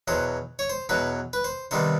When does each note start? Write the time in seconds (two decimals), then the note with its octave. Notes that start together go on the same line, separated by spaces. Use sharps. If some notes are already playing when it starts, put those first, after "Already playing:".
0.08 E2 B2 F#3 C5
0.59 C#5
0.70 C5
0.89 E2 B2 F#3 B4
1.33 B4
1.44 C5
1.71 C3 D#3 G3 B3 C5